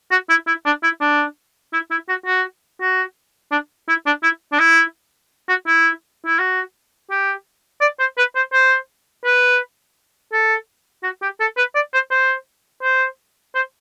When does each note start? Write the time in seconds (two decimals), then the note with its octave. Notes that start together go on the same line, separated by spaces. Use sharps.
0.11 F#4
0.30 E4
0.47 E4
0.66 D4
0.83 E4
1.01 D4
1.73 E4
1.91 E4
2.09 F#4
2.26 F#4
2.81 F#4
3.51 D4
3.88 E4
4.06 D4
4.23 E4
4.52 D4
4.59 E4
5.48 F#4
5.67 E4
6.26 E4
6.39 F#4
7.11 G4
7.81 D5
8.00 C5
8.18 B4
8.36 C5
8.53 C5
9.25 B4
10.33 A4
11.03 F#4
11.22 G4
11.40 A4
11.57 B4
11.75 D5
11.93 C5
12.11 C5
12.83 C5
13.55 C5